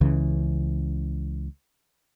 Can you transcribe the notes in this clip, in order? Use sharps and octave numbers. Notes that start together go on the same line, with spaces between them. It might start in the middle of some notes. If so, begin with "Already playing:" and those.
C#2 C#3 E3